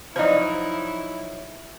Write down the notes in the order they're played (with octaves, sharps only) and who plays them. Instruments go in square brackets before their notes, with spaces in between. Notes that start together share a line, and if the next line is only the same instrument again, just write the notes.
[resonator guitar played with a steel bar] F3 F#3 D#4 [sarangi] E4 [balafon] C5 D5